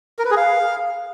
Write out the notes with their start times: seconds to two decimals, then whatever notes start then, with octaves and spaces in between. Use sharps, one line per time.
0.19 A#4
0.25 B4
0.31 G#4
0.37 F5